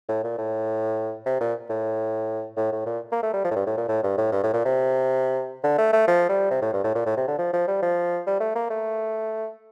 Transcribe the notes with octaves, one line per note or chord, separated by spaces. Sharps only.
A2
A#2
A2
C3
A#2
A2
A2
A2
A#2
A#3
A3
G3
F3
A2
G2
A2
A#2
A2
G2
A2
G2
A2
A#2
C3
D3
A3
A3
F3
G3
C3
A2
G2
A2
A#2
A2
C3
D3
F3
F3
G3
F3
G3
A3
A#3
A3